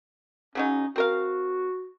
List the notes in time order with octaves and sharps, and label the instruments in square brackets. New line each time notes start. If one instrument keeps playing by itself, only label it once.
[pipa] C#3 F#3 D#4 [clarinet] C#4
[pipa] C4 A#4 F5 [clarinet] F#4